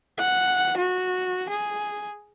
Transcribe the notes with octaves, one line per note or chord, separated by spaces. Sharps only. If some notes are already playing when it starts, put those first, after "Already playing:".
F#5
F#4
G#4